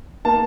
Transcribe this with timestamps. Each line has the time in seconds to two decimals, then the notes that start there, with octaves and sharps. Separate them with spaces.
0.25 A#3 A5